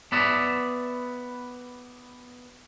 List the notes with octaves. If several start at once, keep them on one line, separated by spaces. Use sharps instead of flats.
B3 B4 D5 E5